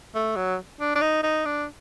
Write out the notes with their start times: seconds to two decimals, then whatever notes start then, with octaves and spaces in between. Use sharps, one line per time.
0.15 A3
0.36 F#3
0.80 D4
0.96 D4
1.01 D#4
1.23 D#4
1.45 D4